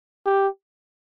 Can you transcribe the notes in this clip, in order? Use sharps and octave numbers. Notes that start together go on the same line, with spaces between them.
G4